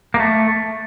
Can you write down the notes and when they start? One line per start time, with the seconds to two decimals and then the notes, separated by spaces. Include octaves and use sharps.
0.14 A#3
0.20 A3